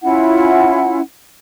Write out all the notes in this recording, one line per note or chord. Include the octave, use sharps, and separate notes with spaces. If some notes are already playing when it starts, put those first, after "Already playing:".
C#4 E4 F4 F#5